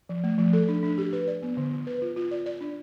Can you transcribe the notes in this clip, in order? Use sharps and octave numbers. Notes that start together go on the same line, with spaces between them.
F3
A3
F3
A4
D4
D4
G4
B4
D5
B3
D3
D3
B4
F4
F4
D5
D5
D4